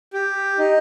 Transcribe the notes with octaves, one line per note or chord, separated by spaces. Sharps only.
G4
D#4